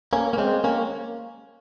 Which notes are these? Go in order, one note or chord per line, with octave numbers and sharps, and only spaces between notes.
A#3 C#4
A#3
G#3 C4
A#3 C#4